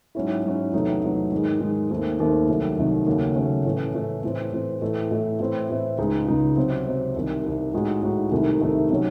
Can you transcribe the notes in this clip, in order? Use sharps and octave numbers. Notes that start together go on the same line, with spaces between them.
G#2 F#3 C#4 E4
G#2 F#3 C#4 E4
E2 C3 F#3 A3 D#4
E2 C3 F#3 A3 D#4
G#2 D#3 G#3
G#2 D#3 G#3
D#2 D#3 A3 C4
D#2 D#3 A3 C4
C2 C3 D#3 F#3 A3
C2 C3 D#3 F#3 A3
D#2 C#3 F#3 A3 C#4
D#2 C#3 F#3 A3 C#4
A2 E3 A3 C#4
A2 E3 A3 C#4
A2 E3 C4
A2 E3 C4
A2 E3 A3
A2 E3 A3
A2 E3 C4 E4
A2 E3 C4 E4
C#2 C#3 G#3 D#4
C#2 C#3 G#3 D#4
C3 F#3 C4
C3 F#3 C4
C2 C3 D#3
C2 C3 D#3
A2 G#3 D#4 F#4
A2 G#3 D#4 F#4
C2 C3 D#3 A3 D#4
C2 C3 D#3 A3 D#4
C3 D#3 F#3 C#4